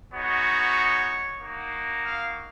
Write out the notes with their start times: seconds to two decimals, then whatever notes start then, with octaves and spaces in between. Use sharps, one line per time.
0.11 G#3 B3 D#4 F#4 C#5
1.39 A#3 D#4 F#4
2.04 F5